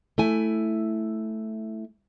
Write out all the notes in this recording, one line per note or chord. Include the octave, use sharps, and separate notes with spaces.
A3 E4 G#5